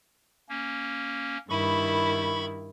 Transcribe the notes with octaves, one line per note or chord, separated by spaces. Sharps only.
A#3 C#4
G2 D#3 E4 B5 C#6